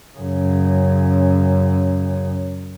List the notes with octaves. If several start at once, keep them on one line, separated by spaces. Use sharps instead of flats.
F#2 C#3